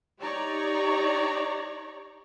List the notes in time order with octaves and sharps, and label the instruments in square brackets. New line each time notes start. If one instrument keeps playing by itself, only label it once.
[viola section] D#4 G4 C#5 D5 A#5